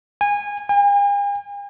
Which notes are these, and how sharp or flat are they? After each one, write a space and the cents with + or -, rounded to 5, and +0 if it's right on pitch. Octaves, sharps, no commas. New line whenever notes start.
G#5 -20
G#5 -45